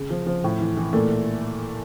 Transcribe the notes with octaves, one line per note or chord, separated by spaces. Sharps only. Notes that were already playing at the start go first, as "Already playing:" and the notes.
Already playing: C#3
F3
F3
A2
E3
E3
A#2 A3